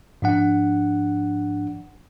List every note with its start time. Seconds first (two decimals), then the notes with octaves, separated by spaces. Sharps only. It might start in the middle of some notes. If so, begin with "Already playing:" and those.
0.22 G#2 F3 D4 F#5